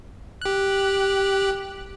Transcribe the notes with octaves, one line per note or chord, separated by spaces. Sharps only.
G4 F#6